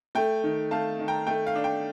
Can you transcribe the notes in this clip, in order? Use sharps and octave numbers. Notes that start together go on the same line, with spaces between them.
A3 G5
D#3
A3 F5 A5
D#3
G5 A#5
A3 G5
F5
D4
G5